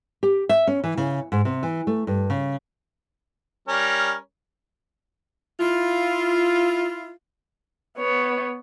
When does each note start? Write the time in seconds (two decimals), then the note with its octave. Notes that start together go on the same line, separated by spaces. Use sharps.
0.23 G4
0.49 E5
0.67 C#4
0.84 E3
0.97 C#3
1.32 G#2
1.45 C3
1.63 E3
1.87 A3
2.07 G2
2.30 C#3
3.68 G3 C#4 A#4
5.60 E4 F4
7.98 B3 C#5